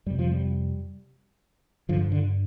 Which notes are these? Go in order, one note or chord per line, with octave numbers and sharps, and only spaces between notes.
F2 C3 G3
F3
G3
G2 D3 F3
D3